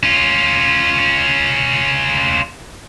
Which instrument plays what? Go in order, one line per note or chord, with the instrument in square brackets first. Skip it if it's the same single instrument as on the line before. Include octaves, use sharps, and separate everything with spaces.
[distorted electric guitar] C#4 F4